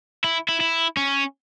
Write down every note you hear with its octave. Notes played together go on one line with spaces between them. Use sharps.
E4
E4
E4
C#4